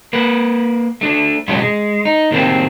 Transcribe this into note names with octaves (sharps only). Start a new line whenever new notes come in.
A#3 B4
A3 D4
F#2 B2 G#3 C#4 E4 F4
G#3
D#4
A2 D#3 G3 A#3 C4 G4